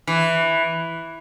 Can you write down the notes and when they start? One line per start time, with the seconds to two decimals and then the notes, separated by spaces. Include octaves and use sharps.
0.07 E3